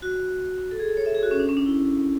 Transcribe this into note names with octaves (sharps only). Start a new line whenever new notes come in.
F#4
A4
G#4
A4
C#5
E5
G#4
F#4
C#4
D4
C#4
D4
E4